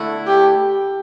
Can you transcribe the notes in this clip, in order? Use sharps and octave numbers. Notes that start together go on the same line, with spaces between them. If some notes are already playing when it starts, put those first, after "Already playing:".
Already playing: D3 A3 E4
G4